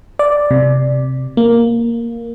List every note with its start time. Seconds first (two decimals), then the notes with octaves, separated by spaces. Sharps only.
0.19 D5
0.51 C3
1.37 A#3